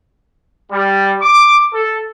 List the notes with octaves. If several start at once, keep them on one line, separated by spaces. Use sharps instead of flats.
G3
D6
A4